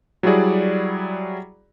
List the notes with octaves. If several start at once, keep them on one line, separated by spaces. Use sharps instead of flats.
F#3 G3 E4 F#4 G#4 D5